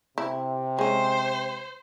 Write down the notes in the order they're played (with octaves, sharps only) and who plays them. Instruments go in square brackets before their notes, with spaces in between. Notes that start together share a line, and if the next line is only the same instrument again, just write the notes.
[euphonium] C3 [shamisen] E4
[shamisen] G#3 C#4 [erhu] C5